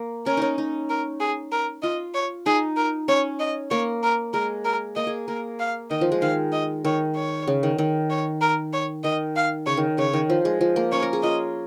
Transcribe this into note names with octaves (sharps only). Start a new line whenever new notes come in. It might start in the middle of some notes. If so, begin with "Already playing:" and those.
Already playing: A#3
C#4 A#4
C#4 D#4
D#4
A#4
G#4
A#4
F4 D#5
C#5
D#4 G#4
A#4
C#4 C#5
D#5
A#3 C#5
A#4
G#3 A#4
A#4
A#3 D#5
G#4
A#3 A#4
F5
D#3 D#5
F3
G#3
D#3 F5
D#5
D#3 C#5
C#5
C#3
D#3
D#3
C#5
A#4
C#5
D#3 D#5
F5
C#3 C#5
D#3
C#3 C#5
D#3
F3
G#3
F3
A#3
C#4 C#5
A#4
G#4
F4 D#5